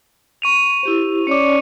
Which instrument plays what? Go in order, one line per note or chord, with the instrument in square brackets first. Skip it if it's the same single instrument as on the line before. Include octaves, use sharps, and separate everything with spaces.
[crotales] C#6 D#7 F7
[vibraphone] E4 G4 C5
[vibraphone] C#4 C#5 D5 [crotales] D6 C#7